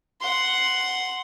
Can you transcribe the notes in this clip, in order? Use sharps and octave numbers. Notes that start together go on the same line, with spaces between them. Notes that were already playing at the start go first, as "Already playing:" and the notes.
F#5 C6